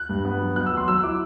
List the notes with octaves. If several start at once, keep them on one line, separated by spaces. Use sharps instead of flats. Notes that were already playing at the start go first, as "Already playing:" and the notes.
Already playing: F#6
G2
B3
F#3
B3 F#6
E6
F#3 C6
F#3 E6
E4 D6